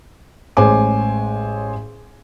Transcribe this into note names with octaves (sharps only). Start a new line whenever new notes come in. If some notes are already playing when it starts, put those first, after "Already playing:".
A1 G#3 C5 C#5 G#5 D6